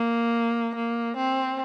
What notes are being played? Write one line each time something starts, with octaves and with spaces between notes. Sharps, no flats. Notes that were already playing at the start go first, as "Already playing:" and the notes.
Already playing: A#3
A#3
C4